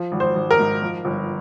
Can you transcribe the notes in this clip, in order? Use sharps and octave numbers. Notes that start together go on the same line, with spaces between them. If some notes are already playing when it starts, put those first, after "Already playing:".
Already playing: F3
G#1
C5
G#1
A#4
G#2
F3
G1